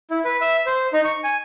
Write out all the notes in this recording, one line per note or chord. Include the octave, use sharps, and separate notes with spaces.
E4
B4
E5
C5
D#4
C#6
G#5